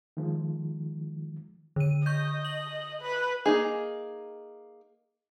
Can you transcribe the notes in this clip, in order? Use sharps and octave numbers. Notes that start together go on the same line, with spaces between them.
D#3 F3 G#3
D3 D#7
D#5 C#6 G6
F#7
B4
A#3 D#4 G#4